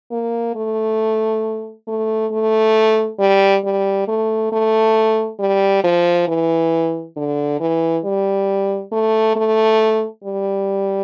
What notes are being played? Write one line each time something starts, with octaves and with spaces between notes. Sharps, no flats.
A#3
A3
A3
A3
G3
G3
A3
A3
G3
F3
E3
D3
E3
G3
A3
A3
G3